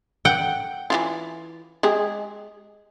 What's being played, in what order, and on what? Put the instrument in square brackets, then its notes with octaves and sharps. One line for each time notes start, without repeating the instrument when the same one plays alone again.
[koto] F#5 G5
[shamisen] E3 E4 F4
G#3 G4 G#4